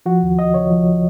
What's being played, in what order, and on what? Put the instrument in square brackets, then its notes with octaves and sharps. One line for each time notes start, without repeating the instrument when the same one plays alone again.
[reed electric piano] F3 F#4
D#2
D#2 D#5
C#3 C#5
F3